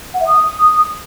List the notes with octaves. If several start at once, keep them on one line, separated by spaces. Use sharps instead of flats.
F#5
E5
D#6